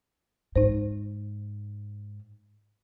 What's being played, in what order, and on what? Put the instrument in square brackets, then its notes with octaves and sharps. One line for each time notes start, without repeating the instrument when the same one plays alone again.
[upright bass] G#2 [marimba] D#4 C5